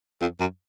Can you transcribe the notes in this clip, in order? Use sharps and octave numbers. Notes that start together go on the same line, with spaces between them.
F2
F#2